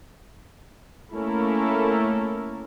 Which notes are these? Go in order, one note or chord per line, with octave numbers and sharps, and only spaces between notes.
A3 A#3 C#4 E4 A4 A#4